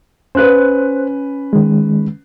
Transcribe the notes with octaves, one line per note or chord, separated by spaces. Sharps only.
C#4 B4 C5 F#6
D#3 G#3